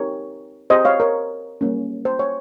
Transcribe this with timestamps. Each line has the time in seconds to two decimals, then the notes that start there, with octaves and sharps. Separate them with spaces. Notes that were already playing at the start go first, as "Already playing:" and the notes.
Already playing: C4 D#4 G4 A#4 C#5
0.70 C4 G4 C5 D#5
0.85 C#5 F5
1.00 A#4 C#5
1.61 G3 A#3 C#4
2.05 C5
2.19 C#5